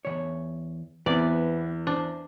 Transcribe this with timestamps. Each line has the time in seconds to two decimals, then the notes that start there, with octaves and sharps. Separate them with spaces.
0.05 E2 C#3 C#5
1.06 E2 B3 C4 D5
1.87 D4 C5